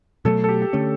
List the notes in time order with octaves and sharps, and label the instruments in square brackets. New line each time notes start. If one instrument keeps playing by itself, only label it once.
[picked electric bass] B2 F#3 A3 [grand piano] A4
[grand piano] A4
G4
G4
[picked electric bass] D3 A3 C#4